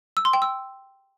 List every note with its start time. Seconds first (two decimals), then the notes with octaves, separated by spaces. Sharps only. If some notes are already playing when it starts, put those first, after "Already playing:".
0.17 E6
0.25 C6
0.33 G5
0.42 E6